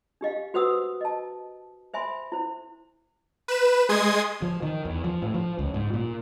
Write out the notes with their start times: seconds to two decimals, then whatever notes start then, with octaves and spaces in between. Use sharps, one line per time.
0.21 D4 G4 D#5 F5
0.54 F#4 B4 C5 F#5 D#6 E6
1.01 D#5 A5
1.94 C5 E5 G#5 B5 C6
2.32 E4 C5
3.48 B4 E7
3.89 G#3 C6 D#6 G#6
4.42 F3
4.63 D#3
4.85 E2
5.04 F3
5.22 A2
5.34 F3
5.59 C#2
5.74 G#2
5.94 A#2